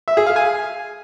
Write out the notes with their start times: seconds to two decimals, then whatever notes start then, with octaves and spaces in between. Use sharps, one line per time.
0.08 E5
0.17 G#4
0.27 F5
0.36 G#5